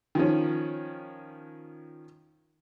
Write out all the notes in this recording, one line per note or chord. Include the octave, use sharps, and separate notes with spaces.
D#3 F3 C#4